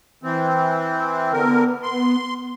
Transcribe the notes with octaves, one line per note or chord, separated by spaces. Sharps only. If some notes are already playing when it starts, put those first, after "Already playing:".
E3 C4
D3 B3 A#4
C6